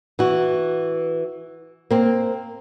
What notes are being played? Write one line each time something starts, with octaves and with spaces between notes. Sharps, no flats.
E3 F#4
A#3 C4